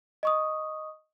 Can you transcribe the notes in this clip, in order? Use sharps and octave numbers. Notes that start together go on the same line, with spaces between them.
D#5 C#6 D#6